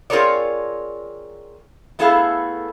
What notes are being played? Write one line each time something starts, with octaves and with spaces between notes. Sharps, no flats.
C4 F4 G#4 A#4 C#5 D5
A3 B3 E4 G#4 A4 F5